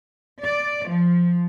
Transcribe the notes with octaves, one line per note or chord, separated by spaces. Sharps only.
D5
F3